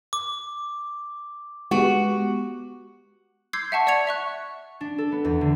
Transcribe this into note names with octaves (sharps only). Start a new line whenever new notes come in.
D6
G#3 B3 F#4 G4
C6 D6 E6 G6 G#6 C7
E5 F#5 A5 C#6
D5 F#5 C#6 G#6 C#7 F7
E5 C#6 F#6
D4
A4
B3
E2
D3